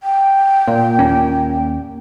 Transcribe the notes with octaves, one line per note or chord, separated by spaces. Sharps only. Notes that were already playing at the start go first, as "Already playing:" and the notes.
G5
A#2
D#2 A#3 C#4